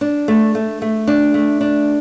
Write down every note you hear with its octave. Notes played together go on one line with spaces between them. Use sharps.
D4
A3
A3
A3
D4
A3
D4